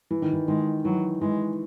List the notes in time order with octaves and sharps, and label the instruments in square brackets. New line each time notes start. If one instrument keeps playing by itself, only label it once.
[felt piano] E3
D#3
E3
[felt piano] D#3 [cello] G#3
[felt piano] E3 [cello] F#3
[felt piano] E3 [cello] G#3